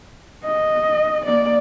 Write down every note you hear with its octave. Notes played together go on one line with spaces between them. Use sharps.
D#5
A#3 D5